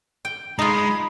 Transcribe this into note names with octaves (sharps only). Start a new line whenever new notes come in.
G5
G#3 D#4 F4 A#5 B5 D#6